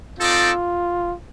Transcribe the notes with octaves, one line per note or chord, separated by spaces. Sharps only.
C4 D#4 F4 A4 D5